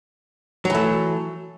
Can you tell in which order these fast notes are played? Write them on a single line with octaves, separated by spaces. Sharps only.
F#3 E3 A3